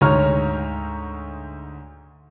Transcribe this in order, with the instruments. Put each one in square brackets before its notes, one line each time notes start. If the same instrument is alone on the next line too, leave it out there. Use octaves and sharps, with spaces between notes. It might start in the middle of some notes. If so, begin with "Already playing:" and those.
[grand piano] D2 G#2 C#5 A#5 F6